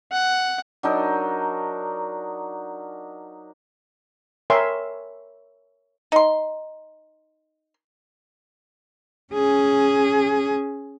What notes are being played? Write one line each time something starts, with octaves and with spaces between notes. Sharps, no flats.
F#5
F#3 D4 D#4 A#4
A#4 C#5 E5 G5 G#5 C6
D#4 C6
C#4 G#4